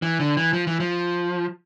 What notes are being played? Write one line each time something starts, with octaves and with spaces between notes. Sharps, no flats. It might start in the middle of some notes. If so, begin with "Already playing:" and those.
E3
D3
E3
F3
E3
F3